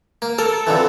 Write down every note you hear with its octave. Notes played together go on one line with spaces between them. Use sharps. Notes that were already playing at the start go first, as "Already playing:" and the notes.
A#3
A4 A#4
F2 D3 E3